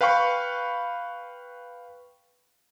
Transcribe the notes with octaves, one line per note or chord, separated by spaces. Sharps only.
B4 F5 G5 B5 C#6